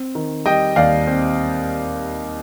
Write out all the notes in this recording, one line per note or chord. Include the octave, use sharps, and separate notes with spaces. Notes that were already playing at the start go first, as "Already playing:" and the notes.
Already playing: C4
D#3
G3 D#5 G5
D#2 D5 F5
C4